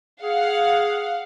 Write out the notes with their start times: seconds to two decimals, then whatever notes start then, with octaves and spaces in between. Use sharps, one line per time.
0.21 G#4 F5 F#5